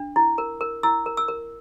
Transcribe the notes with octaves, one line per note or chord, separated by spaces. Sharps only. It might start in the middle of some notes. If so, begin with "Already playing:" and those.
Already playing: D4
E4
A#4
A#4
E4 E6
A#4
E6
A#4